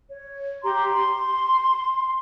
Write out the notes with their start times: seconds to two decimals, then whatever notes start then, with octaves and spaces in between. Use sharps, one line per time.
0.11 C#5
0.63 G4 A#5 C6
0.93 C6